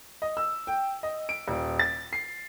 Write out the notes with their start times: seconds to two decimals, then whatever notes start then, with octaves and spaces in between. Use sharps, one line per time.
0.22 D#5
0.37 E6
0.67 G5
1.03 D#5
1.29 D7
1.48 D#1
1.79 A6
2.13 C7